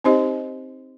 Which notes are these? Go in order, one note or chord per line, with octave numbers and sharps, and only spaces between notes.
C4 D#4 G4 C5 D#5